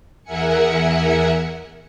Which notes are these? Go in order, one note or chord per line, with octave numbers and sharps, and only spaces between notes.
E2 A#4 E5 F#5 G#5 C#7